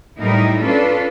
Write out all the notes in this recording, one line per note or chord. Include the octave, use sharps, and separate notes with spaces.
A2 G3 D#4 E4 A#4
C#4 D4 F4 A4 B4